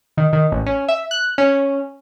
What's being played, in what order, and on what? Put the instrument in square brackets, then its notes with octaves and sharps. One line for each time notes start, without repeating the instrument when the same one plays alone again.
[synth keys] D#3
D#3
A1
C#4
E5
F#6
C#4